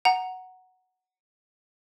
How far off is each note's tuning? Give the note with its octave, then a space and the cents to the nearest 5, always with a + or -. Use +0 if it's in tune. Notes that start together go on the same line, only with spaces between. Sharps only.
F#5 +0 A#5 +0